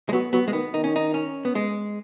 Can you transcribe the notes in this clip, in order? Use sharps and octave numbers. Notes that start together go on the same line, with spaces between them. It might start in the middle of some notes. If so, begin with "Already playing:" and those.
G#3
F#3 B3
F#3 B3
G#3
D#3 B3
D#3 D#4
C#4
D#4
C#4
B3
G#3